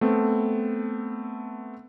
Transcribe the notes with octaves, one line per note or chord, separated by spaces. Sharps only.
A3 B3 C4 A4